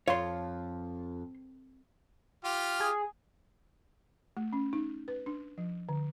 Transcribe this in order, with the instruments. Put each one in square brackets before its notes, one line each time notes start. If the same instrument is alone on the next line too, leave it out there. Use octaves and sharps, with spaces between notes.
[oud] F2 [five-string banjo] F4 [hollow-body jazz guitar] C#5 C6
[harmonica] F4 G4 F6
[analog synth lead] G#4
[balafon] A3
C#4
D#4
B4
D4
F3
D3